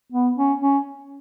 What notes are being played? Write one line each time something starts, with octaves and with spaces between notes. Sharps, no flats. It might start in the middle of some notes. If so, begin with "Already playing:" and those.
B3
C#4
C#4